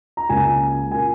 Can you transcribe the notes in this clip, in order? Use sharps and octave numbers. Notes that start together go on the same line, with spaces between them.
A#5
C#2 C#3 A#3 G#5
A#2 A#3 G#5